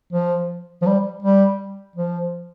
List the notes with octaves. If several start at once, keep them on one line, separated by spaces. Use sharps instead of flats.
F3
F3
G3
G3
F3